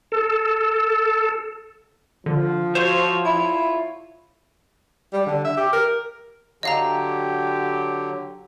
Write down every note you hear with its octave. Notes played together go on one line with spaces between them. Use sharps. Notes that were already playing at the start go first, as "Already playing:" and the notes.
A4
D3 F3
F4 F#4 C5 C#5 E5
E4
G3
D3
E5
G4
A#4
D3 F#3 G4 D#5 F5 A#5